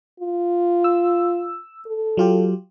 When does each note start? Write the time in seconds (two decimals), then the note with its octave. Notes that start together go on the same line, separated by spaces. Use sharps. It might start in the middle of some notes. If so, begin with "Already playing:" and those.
0.20 F4
0.84 E6
1.87 A4
2.17 F#3 F4 G4